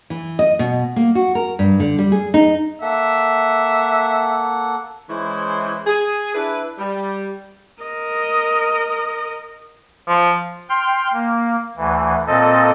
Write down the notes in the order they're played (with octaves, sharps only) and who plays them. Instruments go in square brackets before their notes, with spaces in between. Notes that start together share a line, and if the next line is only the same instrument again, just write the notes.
[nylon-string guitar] E3
D#5
B2
A#3
F#4
A#4
G2
D3
G3
G#4
D#4
[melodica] A#3 A4 F#5 [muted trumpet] E5
[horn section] E3 G#3 C#4 E4 C5
G#4
D4 E4 B4
G3
[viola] A#4 D#5
[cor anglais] F3
[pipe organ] G5 C6 F6
A#3
D2 E3
A#2 C4 A4 D#5